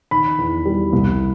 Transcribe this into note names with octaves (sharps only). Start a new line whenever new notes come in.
D#3 B5
E2
G3
C2